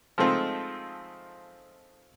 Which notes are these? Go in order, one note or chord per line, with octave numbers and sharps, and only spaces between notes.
F3 G#3 A3 C4 D#4 F4